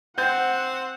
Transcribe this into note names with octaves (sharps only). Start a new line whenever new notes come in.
C4 F#5 G5 G6